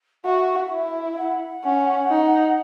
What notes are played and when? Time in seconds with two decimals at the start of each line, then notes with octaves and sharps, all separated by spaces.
0.25 F#4 E5
0.72 E4
1.13 E5
1.18 F#5
1.64 C#4
2.10 D#4